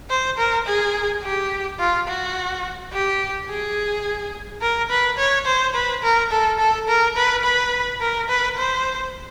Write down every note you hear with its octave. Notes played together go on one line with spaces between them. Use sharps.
C5
A#4
G#4
G4
F4
F#4
G4
G#4
A#4
B4
C#5
C5
B4
A#4
A4
A4
A#4
B4
B4
A#4
B4
C5